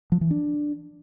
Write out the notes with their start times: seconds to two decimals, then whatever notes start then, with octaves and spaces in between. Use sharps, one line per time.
0.12 F3
0.21 E3
0.31 D4